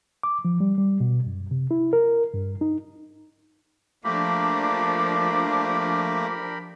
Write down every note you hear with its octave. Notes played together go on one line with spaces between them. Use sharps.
D6
F3
G3
G3
B2
F#2
C3
E4
A#4
G2
D#4
F3 A3 A#3 D4 G4 A#4 B5 D6